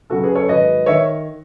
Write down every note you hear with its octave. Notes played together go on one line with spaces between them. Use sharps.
F#2 C#3 F#3 F#4 A4
G#4 B4
A4 C#5
G#2 D#3 F#3 B4 D#5
D#3 C#5 E5